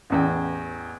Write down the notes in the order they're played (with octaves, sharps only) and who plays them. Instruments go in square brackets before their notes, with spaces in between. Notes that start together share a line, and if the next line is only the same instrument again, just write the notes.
[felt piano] A1 E2 G5